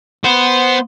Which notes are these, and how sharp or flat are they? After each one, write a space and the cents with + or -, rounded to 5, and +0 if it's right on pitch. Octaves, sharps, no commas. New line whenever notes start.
B3 +0 C5 -10